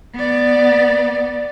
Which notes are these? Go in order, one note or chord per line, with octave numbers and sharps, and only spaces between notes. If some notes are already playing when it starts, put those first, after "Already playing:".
B3 D5